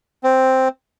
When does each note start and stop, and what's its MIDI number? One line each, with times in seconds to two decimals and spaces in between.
0.24 0.68 60